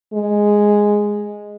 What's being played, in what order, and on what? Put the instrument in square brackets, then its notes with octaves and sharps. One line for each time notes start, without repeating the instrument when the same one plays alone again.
[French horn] G#3